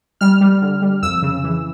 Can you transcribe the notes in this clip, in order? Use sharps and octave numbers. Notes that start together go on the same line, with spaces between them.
G3 F6
G3
D3
G3
F2 E6
C#3
E3